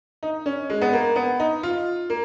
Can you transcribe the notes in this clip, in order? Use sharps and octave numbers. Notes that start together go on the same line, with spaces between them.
D#4
C#4
G#3
B3
A#3
B3
D#4
F4
A#3